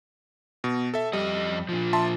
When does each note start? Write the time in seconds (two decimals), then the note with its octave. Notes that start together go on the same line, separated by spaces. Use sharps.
0.64 B2
0.94 A4 E5
1.13 F2 G3 D#5
1.69 A#2 F3
1.93 E5 A5 C6